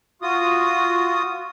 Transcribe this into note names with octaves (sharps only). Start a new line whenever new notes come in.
F4 F#4 D#6